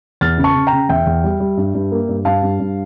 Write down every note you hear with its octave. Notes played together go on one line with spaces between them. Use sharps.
E2 F6 A6
C#3
A5 C#6
C#3
G5 A#5
C#3
E2 E5 G5
E2
G3
G3
G2
G2
A#3
G2
G2 F5 A5
G2
G2